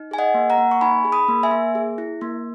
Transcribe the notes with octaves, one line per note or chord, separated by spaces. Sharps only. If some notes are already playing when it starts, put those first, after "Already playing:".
Already playing: D#4
G#4 G#5
D#5 F#5
A#3
F#5 A#5
A#3
C#6
D#4 G#5 B5
G#4
B5 D#6
A#3
E5 G#5
A#3
G#4
E4
A#3